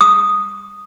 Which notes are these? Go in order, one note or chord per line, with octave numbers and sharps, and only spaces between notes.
D#6